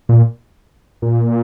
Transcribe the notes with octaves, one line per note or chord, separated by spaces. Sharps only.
A#2
A#2